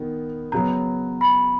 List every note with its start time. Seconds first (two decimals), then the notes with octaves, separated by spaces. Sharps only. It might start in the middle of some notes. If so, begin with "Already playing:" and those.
Already playing: D#3 B3
0.52 C#3 F#3 B3 A#5
1.21 B5